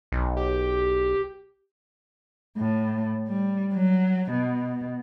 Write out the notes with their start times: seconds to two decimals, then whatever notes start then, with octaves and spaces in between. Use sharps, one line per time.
0.12 B1
0.37 G4
2.58 A2
3.28 G3
3.74 F#3
4.32 B2